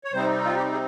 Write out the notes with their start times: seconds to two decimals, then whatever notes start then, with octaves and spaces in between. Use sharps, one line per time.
0.04 C#5
0.13 C3 G3 C4 D#4 C5
0.45 F4
0.56 G4
0.72 G#4